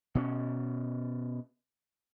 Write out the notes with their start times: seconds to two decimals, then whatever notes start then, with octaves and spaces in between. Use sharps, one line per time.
0.15 B2 C4 C#4